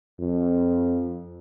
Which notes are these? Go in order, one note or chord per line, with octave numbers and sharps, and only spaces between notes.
F2